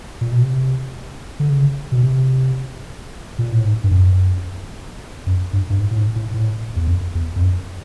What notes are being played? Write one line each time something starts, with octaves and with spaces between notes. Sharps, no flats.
A#2
B2
C3
D3
C#3
B2
C3
A#2
A2
G#2
G2
F#2
F#2
G2
G2
G#2
A2
G#2
A2
A2
E2
F2
E2
F2
F#2